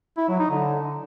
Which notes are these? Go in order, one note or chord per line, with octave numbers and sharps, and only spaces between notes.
E4
F#3
D#4
D3